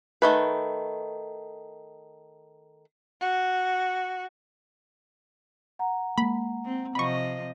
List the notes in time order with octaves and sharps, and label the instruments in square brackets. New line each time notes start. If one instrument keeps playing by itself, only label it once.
[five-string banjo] D#3 A3 B4
[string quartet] F#4
[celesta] F#5 A#5
[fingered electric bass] G#3 A#3 [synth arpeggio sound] B5
[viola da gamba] C4
[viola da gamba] C3 F3 D#5 [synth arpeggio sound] B5 C#6